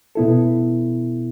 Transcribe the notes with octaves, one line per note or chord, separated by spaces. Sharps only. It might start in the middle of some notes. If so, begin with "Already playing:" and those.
B2 B3 E4 A4